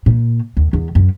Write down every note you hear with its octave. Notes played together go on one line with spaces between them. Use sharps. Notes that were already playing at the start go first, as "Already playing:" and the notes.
A#2
D#2
E2
F#2